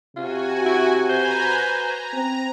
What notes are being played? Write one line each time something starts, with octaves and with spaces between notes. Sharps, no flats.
C3 F4 F#4 G#5
E4
B4 C5 G#5 A#5
A#5
C4